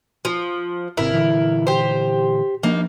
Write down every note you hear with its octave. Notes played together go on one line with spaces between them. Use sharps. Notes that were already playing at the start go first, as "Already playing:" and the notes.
F3
G#1 C3 E4 A#4
A#2 D3 E3
G4 C5
F3 A#3 D4 D#4